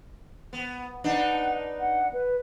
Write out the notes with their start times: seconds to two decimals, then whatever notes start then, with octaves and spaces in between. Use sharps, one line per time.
0.53 B3
1.04 D4 D#4 B4 F#5
1.79 F#5
2.13 B4